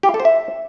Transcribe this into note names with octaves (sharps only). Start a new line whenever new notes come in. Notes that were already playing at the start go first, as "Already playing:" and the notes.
G4
F5
A4
C5
E5